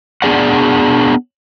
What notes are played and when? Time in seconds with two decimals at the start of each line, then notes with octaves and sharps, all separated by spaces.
0.22 B3 D4 G#4 D5 F#5